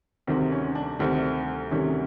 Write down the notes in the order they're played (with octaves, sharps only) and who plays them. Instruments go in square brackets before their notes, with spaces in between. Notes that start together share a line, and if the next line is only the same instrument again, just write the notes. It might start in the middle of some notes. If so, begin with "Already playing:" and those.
[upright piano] D2 C3 D#3 G3 C4
C#4
D4
D2 C3 D#3 G3 C4
D2 C3 D#3 G3 C#4